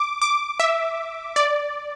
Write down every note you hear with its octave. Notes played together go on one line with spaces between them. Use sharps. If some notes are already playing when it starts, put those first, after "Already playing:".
Already playing: D6
D6
E5
D5